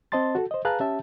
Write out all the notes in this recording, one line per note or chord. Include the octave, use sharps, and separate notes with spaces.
C4 C5 D#5 A5 C6 A6
F#4 A4
C5 D#5
G#4 B4 F5 A5 A#5 F#6
C#4 G4 E5 A5